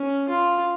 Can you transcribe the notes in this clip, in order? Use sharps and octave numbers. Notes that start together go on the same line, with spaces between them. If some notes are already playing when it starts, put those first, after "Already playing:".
Already playing: C#4
F4